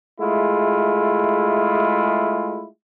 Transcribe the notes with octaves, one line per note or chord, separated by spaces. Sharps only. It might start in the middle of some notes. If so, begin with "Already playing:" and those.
G#3 A3 E4 F4 G#4